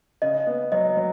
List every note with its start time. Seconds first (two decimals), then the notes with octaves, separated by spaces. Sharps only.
0.22 C#3 D#5
0.47 B3
0.72 F#3 D#5
0.97 F#3